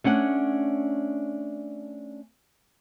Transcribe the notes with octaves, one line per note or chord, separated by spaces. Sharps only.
A3 C#4 D4 F#5